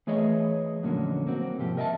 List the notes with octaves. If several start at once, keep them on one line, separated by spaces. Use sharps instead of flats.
E3 A3 G#4 C#5 D#5
F2 A#2 D3 F#3 A#3 C#4
A#3 C4 F#4
G#2 C3 F3 G4
A#4 D#5 E5 G5 A5